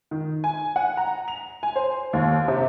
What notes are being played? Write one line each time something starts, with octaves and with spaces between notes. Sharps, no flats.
D#3
G#5
F#5
A#5
F7
G#5
C5
D#2
C3